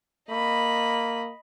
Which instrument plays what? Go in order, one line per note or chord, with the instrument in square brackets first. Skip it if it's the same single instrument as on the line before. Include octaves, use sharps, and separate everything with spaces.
[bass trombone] A#3 [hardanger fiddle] D#5 B5